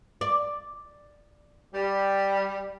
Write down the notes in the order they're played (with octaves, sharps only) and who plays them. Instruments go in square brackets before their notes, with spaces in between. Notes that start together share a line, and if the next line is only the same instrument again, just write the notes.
[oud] D5
[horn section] G3